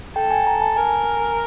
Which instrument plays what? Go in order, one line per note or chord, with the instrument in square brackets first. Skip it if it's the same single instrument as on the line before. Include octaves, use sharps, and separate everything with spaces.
[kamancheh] A4 [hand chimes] G5
[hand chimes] G#5
A#5
A5
[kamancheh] A#4 [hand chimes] G#5